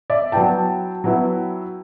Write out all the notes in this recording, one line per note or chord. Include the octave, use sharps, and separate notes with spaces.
D5 E5
F#3 B3 E4 G5 A5
F#3 B3 E4